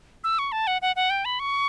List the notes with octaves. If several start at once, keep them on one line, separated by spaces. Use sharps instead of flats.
E6
C#6
A5
F#5
F#5
F#5
G5
B5
C#6